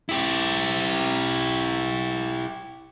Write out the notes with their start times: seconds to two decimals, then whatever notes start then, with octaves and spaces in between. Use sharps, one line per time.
0.09 E4 G4